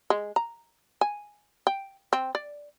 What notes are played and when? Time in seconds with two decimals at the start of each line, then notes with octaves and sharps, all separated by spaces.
0.10 G#3
0.36 A#5
1.01 G#5
1.67 G5
2.13 C4
2.35 D5